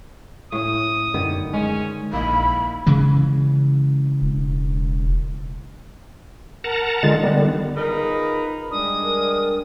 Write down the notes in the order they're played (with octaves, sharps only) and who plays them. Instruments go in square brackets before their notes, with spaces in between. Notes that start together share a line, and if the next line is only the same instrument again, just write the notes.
[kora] A2 C#4 [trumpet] D#6
[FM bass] F#2 [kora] D3 D#3 B3
[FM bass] G#3 [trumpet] C#4
[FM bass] A#1 [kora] A#3 A#4 D#5 [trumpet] E4 [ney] B5
[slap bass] C#3 E3 G#3
[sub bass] E1
[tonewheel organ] A#4 F#5 A5 A#5
D3 D#3 G#3 F4 A6
D3 D#3 G3 B3
[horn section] D#4 F4 G#4 A#4 B4
[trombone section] G3 G#3 D4 [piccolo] D#6
[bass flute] A#4